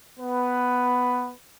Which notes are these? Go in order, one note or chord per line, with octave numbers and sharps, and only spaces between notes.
B3 B4